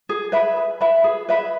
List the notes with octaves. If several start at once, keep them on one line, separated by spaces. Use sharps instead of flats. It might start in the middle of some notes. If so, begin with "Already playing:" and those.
G#4
B4 E5 B5
G#4
B4 E5 B5
G#4
B4 E5 B5